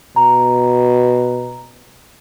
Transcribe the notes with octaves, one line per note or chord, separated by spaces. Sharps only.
B2 A#5